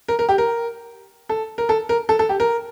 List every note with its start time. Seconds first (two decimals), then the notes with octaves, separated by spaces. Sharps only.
0.08 A#4
0.19 A#4
0.29 G4
0.38 A#4
1.29 A4
1.58 A#4
1.69 A4
1.89 A#4
2.09 A4
2.19 A4
2.29 G4
2.40 A#4